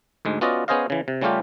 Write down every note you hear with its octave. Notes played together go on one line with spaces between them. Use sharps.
D2 G#2 G#3
B3 C#4 F4 F#4 D5 D#5
B3 C#4 G#4 C5 D#5 F5
C#3 E3
C3
C#3 G3 A3 C#4 F4 G4